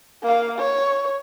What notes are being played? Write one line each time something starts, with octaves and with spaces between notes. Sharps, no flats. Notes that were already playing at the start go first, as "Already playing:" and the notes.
A#3 F5
C#5